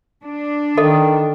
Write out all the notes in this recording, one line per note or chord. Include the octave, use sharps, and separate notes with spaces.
D4
D#3 A4 D#5